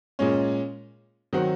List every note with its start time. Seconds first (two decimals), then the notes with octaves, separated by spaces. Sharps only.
0.19 A#2 G#3 C#4
1.33 D#3 F#3 C4 F#4